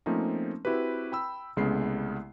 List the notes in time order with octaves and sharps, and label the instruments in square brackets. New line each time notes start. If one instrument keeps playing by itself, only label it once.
[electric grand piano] F3 A3 A#3 C4 C#4 D#4
C4 E4 F#4 G4 B4
G5 B5 E6
C2 C#3 G#3 A3 B3 C7